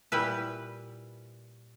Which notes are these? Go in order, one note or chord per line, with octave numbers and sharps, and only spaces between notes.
A#2 G3 E4 B4